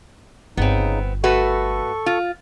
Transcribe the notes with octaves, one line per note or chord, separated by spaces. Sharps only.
G1 C#3 B3 C4 D#4
A3 F#4 A4 B4 C#6
F4